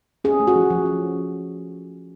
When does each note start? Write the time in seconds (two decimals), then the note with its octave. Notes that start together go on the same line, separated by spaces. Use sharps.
0.24 C#4 G#4
0.40 A3
0.47 F#4
0.56 F3
0.70 F3
0.86 C#4